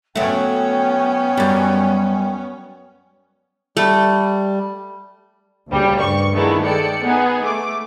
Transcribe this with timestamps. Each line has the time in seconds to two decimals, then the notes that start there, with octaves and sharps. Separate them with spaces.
0.15 F#3 A3 B3 C#4 G5
1.37 F#2 G3
3.77 G3 A3
5.68 D2 A#2 C#3 G3
6.00 G2 C#6
6.33 D#3 A3 B3 D4 E4 G#4
6.63 G#3 A4 D5 G5 C#7
7.02 B3 D#4 G#4
7.44 A3 D6